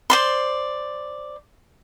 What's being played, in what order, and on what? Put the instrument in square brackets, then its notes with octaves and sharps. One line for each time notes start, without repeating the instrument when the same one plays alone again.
[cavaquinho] C5 D5 C6